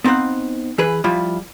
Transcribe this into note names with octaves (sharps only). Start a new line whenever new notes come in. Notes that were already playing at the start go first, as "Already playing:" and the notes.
B3 C4 D#4 F5 F#5
E3 G#4 B4
F3 G3 E4 F4